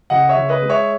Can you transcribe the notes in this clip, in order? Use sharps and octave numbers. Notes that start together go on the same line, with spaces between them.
C#2 D#5 F#5
C#5 E5
C#2
B4 D#5
G#3
C#5 E5